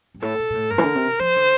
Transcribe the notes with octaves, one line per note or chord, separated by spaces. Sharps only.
G2
A2 A4
A#2
A#2
A2
G2 A#4
E3
D3
C3
F3 C5
D3